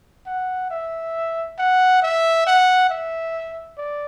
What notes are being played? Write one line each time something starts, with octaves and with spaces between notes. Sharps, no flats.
F#5
E5
F#5
E5
F#5
E5
D5